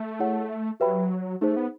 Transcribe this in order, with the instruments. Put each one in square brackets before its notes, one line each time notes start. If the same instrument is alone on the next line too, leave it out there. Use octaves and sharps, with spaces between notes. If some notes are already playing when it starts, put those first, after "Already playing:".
Already playing: [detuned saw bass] A3
[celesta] E4 G#4 C#5 F#5
[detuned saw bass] F#3 [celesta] G4 B4 E5 G5 B5
[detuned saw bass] A3 [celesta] D#4 G#4 C5
[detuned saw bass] B3